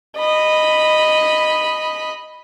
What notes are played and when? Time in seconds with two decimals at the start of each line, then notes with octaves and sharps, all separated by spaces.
0.18 D#5 B5